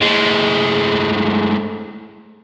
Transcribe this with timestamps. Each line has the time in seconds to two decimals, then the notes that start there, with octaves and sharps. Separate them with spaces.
0.01 A2 G#3